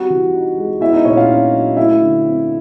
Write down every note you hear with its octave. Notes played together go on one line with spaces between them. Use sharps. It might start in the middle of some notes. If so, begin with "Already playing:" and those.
Already playing: G3 C4 F#4 F#5
E3
D#4
G#3
B3 E4 E5
D#4 D#5
A#2 C#4 C#5
F4 F5
D4
F#3
A3 E4 E5
D3
C4